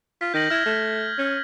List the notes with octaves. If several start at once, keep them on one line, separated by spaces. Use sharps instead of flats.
F4 B6
D#3 G6 A#6 F#7
E4 F6 G#6
A3
C#4